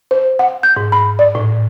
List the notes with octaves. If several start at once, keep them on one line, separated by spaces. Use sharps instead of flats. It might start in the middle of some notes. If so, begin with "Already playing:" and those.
C5
F#5
G6
G#2
B5
D5
A2